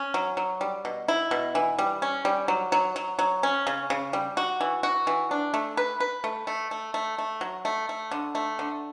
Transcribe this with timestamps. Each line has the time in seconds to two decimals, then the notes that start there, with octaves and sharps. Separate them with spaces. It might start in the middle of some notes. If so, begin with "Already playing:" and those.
Already playing: C#4
0.14 F#3
0.37 F#3
0.61 G3
0.85 B2
1.08 E4
1.31 B2
1.55 E3
1.79 G3
2.02 C#4
2.25 G3
2.48 F#3
2.72 F#3
2.96 F#3
3.19 F#3
3.43 C#4
3.67 C#3
3.90 C#3
4.13 G3
4.37 F#4
4.61 E3
4.83 F#4
5.07 E3
5.31 D4
5.54 A3
5.77 B4
6.00 B4
6.24 A3
6.47 A3
6.71 A3
6.94 A3
7.18 A3
7.41 F#3
7.65 A3
7.89 A3
8.11 D3
8.35 A3
8.59 D3